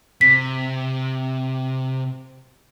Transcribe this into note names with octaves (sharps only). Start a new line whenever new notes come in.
C3 B6